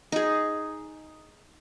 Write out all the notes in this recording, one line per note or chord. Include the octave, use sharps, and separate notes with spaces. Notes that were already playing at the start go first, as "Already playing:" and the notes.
D#4 G#4